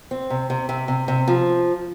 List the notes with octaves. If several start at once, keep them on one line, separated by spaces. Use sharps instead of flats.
C4
C3
C3
C3
C3
C3
F3